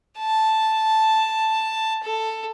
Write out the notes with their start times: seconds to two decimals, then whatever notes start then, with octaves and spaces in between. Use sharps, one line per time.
0.19 A5
2.03 A4